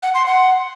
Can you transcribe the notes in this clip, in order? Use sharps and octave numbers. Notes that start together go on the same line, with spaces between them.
F#5
C6
F#5